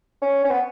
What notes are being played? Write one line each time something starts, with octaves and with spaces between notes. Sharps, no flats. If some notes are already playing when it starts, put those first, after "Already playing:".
C#4
C#4
B3